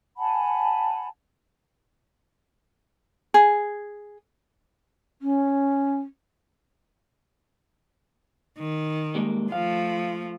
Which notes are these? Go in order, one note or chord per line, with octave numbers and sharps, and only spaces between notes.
F#5 G#5 A5 B5
G#4
C#4
D#3
G3 G#3 A#3
F3 A3 F5